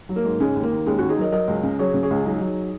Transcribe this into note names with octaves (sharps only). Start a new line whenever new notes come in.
F#3
A#3
G#2
C#3 G#3 C#4
D#2
A#3
D#2
D#2 G#3 C#4
D#2 C#4 F#4
D#4 G#4
F#3 A#4 D#5
F#3 A#4 D#5
C#2
C#3
F#3 G#4 C#5
C#3
G#4 C#5
C#2
F#3 D#4 G#4
F#3